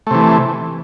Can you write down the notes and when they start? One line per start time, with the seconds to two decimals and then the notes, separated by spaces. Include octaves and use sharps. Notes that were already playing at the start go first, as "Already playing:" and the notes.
0.07 A3
0.11 C3
0.15 E3